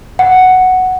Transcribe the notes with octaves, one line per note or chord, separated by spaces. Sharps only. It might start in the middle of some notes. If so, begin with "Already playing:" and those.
F#5